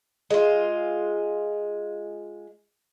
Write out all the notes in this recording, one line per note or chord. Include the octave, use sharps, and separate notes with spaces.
G#3 F4